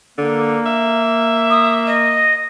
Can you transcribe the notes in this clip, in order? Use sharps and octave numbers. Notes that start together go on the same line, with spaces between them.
D3 A#3
E5
D#6
D#5